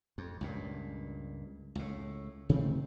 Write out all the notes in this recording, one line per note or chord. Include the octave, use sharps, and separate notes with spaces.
F2
C#2 G2 A#2
C#2 A2
C3 D#3 A3 C4